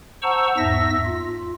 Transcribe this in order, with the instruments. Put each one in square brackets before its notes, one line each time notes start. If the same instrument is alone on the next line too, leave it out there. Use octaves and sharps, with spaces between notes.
[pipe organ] C5 F#5 A5 A#5 C#6 E6
E2 G#2 E5 E6 A#6
F4